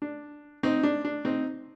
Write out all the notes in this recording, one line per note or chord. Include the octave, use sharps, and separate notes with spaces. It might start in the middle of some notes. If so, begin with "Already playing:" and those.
D4
C4 D#4
D4
D4
C4 D#4